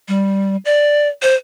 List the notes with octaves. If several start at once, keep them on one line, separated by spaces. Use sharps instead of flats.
G3
D5
C5